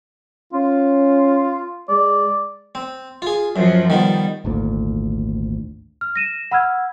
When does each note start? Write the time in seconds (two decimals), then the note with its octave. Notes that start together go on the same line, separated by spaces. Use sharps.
0.53 C#4 F4
1.89 G#3 D5
2.75 C4
3.22 F4 G#4
3.56 F#2 F3 F#3
3.90 D#3 G3 B3
4.45 G#1 D2 A#2
6.01 F6
6.16 A#6 D#7 E7
6.51 F#5 B5 E6 F6 G#6